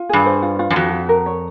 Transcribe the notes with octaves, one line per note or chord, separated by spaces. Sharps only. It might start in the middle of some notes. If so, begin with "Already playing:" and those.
Already playing: F4
G2 G#4
C5
F4
F4
F#2
F2 F#4
F#4
A#4
C#5